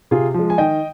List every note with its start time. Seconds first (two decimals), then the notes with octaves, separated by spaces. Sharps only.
0.11 C3 F4 G#4
0.34 F3 G#3
0.50 G#5
0.58 D#3 D#5 G5